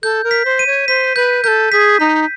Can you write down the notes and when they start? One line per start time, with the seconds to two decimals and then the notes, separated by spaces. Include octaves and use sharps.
0.03 A4 G6
0.24 A#4
0.31 B6
0.45 C5
0.59 D#7
0.67 C#5
0.88 C5 B6
1.16 B4 G6
1.44 A#4 G6
1.48 A4
1.72 G#4 B6
2.00 D#4 B6